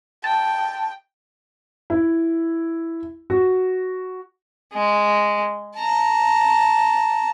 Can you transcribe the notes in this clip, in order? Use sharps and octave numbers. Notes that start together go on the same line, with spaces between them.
G5 A5
E4
F#4
G#3
A5 A#5